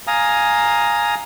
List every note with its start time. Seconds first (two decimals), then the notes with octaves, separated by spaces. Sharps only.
0.07 F5 G#5 A#5 D#6